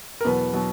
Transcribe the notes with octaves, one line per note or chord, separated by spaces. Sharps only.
A#4
E2 B2 F#3 B3 B4
B2 F#3 B3